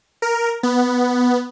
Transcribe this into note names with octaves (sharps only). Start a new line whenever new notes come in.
A#4
B3